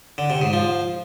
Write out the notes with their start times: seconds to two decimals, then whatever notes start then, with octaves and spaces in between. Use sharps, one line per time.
0.18 D3
0.30 C3
0.42 G#2
0.53 F3